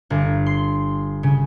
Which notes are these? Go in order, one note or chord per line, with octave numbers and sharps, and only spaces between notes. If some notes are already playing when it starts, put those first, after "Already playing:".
G1
C6
C#3